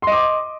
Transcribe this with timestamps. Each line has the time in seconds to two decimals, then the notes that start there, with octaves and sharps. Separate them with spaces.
0.02 C6
0.07 D#5
0.12 D6